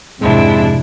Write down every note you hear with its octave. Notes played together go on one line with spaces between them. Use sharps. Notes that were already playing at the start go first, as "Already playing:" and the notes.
F2 G#2 C3 F3 G#3 C4 D4 E4